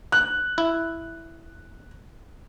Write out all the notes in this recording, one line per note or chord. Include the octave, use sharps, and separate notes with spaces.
F#6
E4